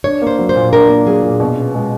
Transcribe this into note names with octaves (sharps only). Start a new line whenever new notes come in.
D4 C#5
A#3
C5
F#3
C5
A#2
D4 A#4
A#3
F#3 G#4
A#2
B2
C#4
G#3